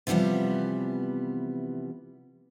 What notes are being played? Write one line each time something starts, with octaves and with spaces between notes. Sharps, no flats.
C3 E3 F3 G3 B3